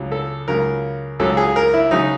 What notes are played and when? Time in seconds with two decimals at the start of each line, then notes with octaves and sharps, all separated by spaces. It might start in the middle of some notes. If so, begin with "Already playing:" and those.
Already playing: C#2 C#3 F#3
0.12 A4
0.48 C#2 C#3 F#3 A#4
1.20 C#2 C#3 F#3 A4
1.37 G#4
1.56 A#4
1.74 E4
1.91 C#3 F#3 D#4